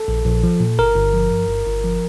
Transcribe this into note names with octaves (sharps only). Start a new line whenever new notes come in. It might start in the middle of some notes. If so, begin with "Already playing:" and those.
Already playing: A4
A#1
A#1
F3
A#2
G1 A#4
G1
F3
G2
G1
G1
F3